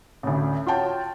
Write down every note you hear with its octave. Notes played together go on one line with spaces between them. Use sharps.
A1 D2
F4 F#4 C#5 G5 A5